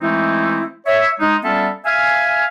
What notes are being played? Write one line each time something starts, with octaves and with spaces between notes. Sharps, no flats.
E3 G#3 A3 C4 D#4 E4
C#5 E5
G#3 D#4
G3 B3 C#4 F4 A4 E5
E5 F5 G#5